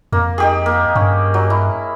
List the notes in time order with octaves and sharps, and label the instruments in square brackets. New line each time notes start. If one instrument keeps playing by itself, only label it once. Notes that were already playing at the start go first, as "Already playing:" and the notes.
[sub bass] F2 [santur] A#3
[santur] D#4 G4 G#4
A#3
[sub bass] G2 [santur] C#4
[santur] F#3
E4